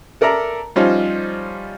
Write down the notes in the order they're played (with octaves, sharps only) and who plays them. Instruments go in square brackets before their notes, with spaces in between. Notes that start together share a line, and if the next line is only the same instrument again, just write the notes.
[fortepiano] A4 A#4 D5 E5 A#5
F3 G3 C#4 D#4 F4 C5